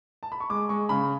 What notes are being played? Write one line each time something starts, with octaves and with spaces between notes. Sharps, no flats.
A5
B5
C#6
G#3 D6
G#3 C#6
C#3 B5